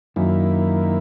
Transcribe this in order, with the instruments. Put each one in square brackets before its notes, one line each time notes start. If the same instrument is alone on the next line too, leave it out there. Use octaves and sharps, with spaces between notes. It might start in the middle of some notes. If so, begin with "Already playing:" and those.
[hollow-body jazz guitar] F#2 [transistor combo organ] D#3 A#3 E4